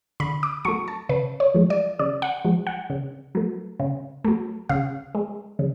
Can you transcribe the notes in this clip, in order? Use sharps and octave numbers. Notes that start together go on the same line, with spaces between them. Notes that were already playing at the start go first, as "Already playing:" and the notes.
D3 B5
D6
F#3 A3 C#6
A5
C#3 B4
C#5
F3 G#3
D5
C#3 D5
F#5
F3 G#3
F#5
C#3
F#3 A3
C#3
F#3 A3
C#3 F5
G#3
C#3